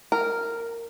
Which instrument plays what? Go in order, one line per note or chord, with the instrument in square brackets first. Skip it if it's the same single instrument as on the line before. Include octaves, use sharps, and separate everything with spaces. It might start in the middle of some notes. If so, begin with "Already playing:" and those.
[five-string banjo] A#4